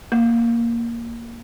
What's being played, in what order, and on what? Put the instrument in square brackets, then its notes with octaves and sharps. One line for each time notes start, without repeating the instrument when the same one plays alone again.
[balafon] A#3